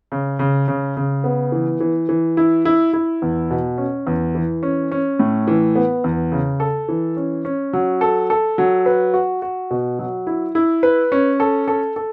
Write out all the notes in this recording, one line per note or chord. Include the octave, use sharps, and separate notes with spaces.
C#3
C#3
C#3
C#3
B3
E3
E3
E3
E4
E4
E4
E2
B2
C#4
E2
E3
C#4
C#4
A2
E3
B3
E2
C#3
A4
E3
C#4
C#4
F#3
A4
A4
F#3
B4
F#4
F#4
B2
F#3
E4
E4
B4
C#4
A4
A4
A4